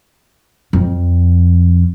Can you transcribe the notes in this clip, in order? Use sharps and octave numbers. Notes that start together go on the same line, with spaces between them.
F2